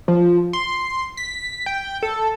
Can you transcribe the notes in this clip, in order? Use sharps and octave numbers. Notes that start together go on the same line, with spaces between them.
F3
C6
B6
G5
A4